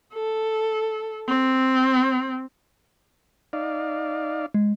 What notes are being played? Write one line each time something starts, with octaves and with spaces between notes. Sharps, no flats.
A4
C4
D#4 D5 F5
G#3